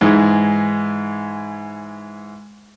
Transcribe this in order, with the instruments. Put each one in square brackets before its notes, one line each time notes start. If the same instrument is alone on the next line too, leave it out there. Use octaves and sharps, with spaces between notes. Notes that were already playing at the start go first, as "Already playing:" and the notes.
[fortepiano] G#2 E3 G#3